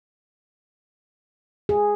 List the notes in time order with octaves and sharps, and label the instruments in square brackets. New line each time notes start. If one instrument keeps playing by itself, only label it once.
[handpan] G#4